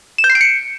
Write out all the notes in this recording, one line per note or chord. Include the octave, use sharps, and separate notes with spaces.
E7
G6
C7
D7
C#7